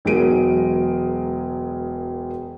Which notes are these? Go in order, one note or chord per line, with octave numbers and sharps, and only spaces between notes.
E1 F#3 G#3 A#4 D7 D#7